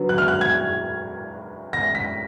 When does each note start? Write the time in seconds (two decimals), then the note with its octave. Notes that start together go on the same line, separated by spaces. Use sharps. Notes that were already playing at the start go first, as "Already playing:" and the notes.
Already playing: D3 F#3 B3
0.09 F#6
0.18 F6
0.28 F#6
0.41 G#6
1.73 A#6
1.95 B6